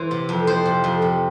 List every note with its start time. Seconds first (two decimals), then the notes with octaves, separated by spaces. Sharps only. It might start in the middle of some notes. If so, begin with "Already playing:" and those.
Already playing: E3 C5
0.11 C3
0.29 F2
0.47 F2 C5
0.66 C3
0.84 F2
1.02 C3